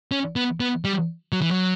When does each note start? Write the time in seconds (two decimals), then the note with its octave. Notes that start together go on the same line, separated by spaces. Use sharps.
0.12 C#4
0.36 B3
0.60 B3
0.85 G3
1.32 F#3
1.41 E3
1.51 F#3